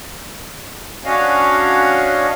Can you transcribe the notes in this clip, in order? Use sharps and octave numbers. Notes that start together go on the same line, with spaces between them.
C#4 D4 F#4 C#5 D#5 F5